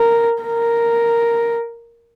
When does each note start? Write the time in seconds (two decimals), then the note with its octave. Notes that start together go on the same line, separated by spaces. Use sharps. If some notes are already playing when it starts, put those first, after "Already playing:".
Already playing: A#4
0.42 A#4